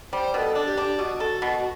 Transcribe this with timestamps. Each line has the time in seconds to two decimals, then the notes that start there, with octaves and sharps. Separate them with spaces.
0.12 G3 C5
0.34 B2 B4
0.38 A4
0.55 D4
0.66 G4
0.77 D4
0.98 B2 F#4
1.20 A4
1.42 B2